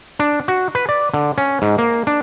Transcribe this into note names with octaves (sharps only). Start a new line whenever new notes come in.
D4
F#4
B4
D5
D3
C#4
G#2
A#3
D4